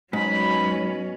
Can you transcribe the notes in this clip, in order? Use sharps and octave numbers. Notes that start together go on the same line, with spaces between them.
G#2 B2 F#3 C#4 B5